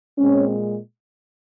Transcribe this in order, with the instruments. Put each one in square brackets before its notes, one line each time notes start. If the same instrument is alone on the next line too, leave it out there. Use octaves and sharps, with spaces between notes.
[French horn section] A#2 G#3 C4 C#4